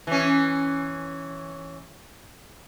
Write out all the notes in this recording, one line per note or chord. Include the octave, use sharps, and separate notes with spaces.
E3 C#4